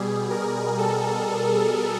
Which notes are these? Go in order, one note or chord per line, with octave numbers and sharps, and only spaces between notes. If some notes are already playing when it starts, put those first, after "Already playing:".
Already playing: B2 G3 G#4
A#4
A4